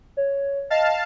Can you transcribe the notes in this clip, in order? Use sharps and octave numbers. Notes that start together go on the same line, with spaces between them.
C#5
D#5 F5 A5